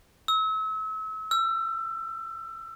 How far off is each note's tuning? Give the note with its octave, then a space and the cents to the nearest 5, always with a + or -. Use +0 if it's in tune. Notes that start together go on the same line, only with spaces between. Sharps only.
E6 -35
E6 +30